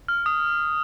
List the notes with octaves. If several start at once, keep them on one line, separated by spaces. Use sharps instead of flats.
F6
D#6